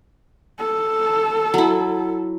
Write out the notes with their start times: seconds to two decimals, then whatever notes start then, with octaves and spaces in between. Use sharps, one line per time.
0.59 A4
1.54 F#3 E4